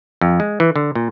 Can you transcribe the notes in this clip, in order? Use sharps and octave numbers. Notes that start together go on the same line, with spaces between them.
F2
G#3
E3
D3
A#2